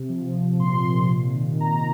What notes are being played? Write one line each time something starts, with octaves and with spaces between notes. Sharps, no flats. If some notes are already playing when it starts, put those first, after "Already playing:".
Already playing: C3
F3
F3
A#2 C6
A#2
C3
D#3
D#3 A#5